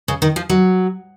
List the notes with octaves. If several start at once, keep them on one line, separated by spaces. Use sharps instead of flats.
C#3
D#3
F3
F#3